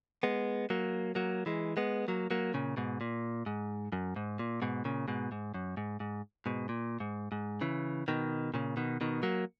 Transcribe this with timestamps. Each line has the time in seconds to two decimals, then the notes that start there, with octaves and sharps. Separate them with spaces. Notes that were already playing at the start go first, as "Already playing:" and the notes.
0.23 G#3 B3
0.70 F#3 A#3
1.15 F#3 A#3
1.46 E3 G#3
1.77 G#3 B3
2.08 F#3 A#3
2.31 F#3 A#3
2.54 A#2 C#3
2.77 G#2 B2
3.01 A#2
3.46 G#2
3.92 F#2
4.16 G#2
4.39 A#2
4.62 G#2 B2
4.85 A#2 C#3
5.08 G#2 B2
5.32 G#2
5.54 F#2
5.77 G#2
6.00 G#2
6.46 G#2 B2
6.69 A#2
7.00 G#2
7.32 G#2
7.61 C#3 E3
8.08 B2 D#3
8.54 A#2 C#3
8.77 B2 D#3
9.01 B2 D#3
9.23 F#3 A#3